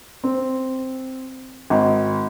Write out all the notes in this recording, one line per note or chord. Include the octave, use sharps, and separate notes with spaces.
C4
G#1